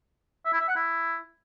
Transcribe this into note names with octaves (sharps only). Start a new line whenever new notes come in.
E5
E4
E5
F#5
E4